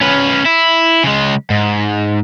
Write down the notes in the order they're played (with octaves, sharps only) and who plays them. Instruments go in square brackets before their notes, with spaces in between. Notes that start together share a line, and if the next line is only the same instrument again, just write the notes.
[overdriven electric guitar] C#4 B4
E4
C#3 G#3
G#2